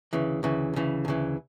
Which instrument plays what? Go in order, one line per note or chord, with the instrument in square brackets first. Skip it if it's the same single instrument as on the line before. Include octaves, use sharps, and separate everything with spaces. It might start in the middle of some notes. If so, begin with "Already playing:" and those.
[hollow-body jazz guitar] D2 C#3 E3
D2 C#3 E3
D2 C#3 E3
D2 C#3 E3